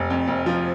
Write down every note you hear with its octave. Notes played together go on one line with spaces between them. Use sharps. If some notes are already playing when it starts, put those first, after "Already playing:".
Already playing: F1
F2
F1
F3